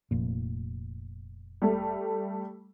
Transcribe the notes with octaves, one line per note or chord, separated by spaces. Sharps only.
F1 A#2
G3 A3